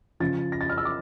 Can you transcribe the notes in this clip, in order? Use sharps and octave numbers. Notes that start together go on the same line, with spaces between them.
C#3 F3 A6
A#6
A6
F6
E6
D6